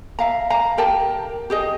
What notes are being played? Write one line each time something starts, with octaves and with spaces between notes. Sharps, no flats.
E5 F5 A#5
F5 A#5
G4 A#4 G5 A5
G4 G#4 D#5